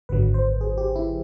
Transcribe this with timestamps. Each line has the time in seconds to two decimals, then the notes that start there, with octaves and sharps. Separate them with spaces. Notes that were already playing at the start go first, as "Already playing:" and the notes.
0.09 G#1 F#2 D3 F#3 B4
0.34 C5
0.61 G#4
0.78 G4
0.96 E4